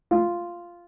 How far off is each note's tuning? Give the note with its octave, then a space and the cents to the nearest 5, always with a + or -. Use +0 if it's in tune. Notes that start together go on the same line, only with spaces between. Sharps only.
F4 -5